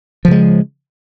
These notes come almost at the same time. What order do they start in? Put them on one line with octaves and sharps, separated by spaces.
F3 C#3 G#3